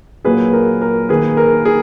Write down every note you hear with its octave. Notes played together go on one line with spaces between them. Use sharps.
A#2 F#3 A#3 G#4 B4
A#4
A#4
D#3 A#3 G#4 B4
A#4
G#4